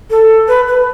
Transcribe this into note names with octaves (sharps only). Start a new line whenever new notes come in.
A4
B4
B4